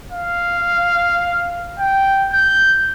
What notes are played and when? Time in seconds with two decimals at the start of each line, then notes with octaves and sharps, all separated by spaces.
0.12 F5
1.80 G5
2.33 G6